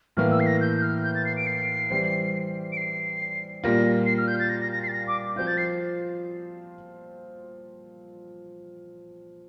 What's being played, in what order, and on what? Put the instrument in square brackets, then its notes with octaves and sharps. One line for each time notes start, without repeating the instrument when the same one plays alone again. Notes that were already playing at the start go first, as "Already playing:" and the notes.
[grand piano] A2 E3 A#3 [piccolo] F6
[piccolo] E6
C7
A#6
G6
G6
F6
G6
A6
C7
D7
C7
[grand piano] E3 G3 C4
[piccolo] D7
C7
[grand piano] A#2 G3 A#3 F4 [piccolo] A#6
[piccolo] C7
F6
G6
A6
A#6
A#6
A#6
C7
A6
A#6
D6
[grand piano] F3 C4 F4 [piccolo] G6
[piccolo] A6
C7